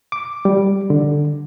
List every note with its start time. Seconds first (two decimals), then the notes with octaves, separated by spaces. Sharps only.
0.12 D6
0.45 G3
0.90 D3